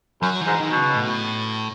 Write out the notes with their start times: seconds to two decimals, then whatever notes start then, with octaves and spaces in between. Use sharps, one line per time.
0.22 F#2 F#3
0.41 E3
0.47 G#2
0.59 D#3
0.71 B2
0.76 C#3
0.95 A2